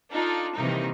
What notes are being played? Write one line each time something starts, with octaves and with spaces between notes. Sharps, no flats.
D4 D#4 F4 A4
C3 D#3 E3 G3 A#3 D#4